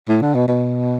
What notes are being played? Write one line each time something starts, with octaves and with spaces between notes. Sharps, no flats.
A2
D3
B2
B2